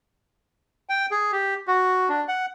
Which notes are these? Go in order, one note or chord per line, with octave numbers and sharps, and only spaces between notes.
G5
G#4
G4
F#4
D4
F#5